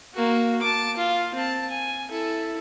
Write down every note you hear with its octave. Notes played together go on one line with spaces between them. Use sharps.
A#3 F#4
A5 D6
F4
C4 A5
G#5
E4 A4